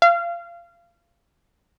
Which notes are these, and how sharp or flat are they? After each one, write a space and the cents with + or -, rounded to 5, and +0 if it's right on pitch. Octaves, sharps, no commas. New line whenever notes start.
F5 -25